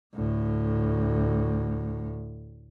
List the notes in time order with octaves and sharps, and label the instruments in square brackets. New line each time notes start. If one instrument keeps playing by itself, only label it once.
[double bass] D2 A2